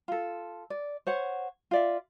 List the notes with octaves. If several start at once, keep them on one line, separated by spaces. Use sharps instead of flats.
F4 A4
D5
C5 C#5 F#5
F4 D5 E5